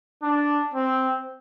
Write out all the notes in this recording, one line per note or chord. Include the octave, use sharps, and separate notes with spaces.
D4
C4